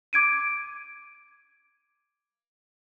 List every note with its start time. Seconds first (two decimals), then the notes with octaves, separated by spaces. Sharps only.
0.13 D6 G#6 D7 D#7